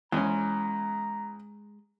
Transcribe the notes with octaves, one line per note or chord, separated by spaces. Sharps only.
E2 G#3 C#4 D#5 A#5